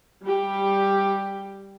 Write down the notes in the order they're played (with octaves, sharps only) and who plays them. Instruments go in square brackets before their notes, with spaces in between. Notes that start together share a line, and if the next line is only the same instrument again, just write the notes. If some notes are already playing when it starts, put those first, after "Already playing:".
[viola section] G3 G4